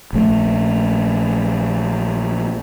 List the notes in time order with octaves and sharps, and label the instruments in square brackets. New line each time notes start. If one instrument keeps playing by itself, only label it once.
[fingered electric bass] A#1 A3